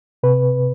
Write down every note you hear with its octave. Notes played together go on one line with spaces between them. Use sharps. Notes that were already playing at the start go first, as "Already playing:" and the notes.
C3 B4